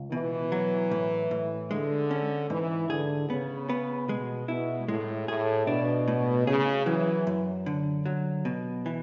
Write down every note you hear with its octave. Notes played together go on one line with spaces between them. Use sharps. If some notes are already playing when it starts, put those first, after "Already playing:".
Already playing: C#2
B2 E3
F#3
A2
A2
D3 G#3
C#4
G#2 E3
D3 G#4
C#3 B3
B3
B2 G#3
B2 E4
A2 G#3
A2 G#4
B2 D4
A2
C#3 G#4
E3 F#3
F#2
D3
F#3
B2
E3